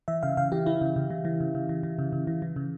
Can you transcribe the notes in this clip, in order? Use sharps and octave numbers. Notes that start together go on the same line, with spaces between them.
E3 E5
C#3 F5
C#3 F5
E3 G4
E3 E4
C#3
C#3
E3
E3
C#3
C#3
E3
E3
C#3
C#3
E3
E3
C#3